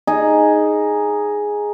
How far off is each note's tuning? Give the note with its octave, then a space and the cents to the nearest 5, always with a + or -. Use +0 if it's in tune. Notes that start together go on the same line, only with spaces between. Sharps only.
D#4 -5 G#4 +0